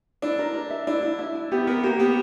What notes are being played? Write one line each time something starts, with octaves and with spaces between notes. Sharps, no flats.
D4 E4
A#4
A#4
E5
D4 E4
E4
E5
E4
B3 G4
B3 A#4
A#3 G4
B3 G4